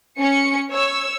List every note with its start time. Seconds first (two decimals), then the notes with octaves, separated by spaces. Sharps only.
0.20 C#4 C#7
0.71 C#5 E6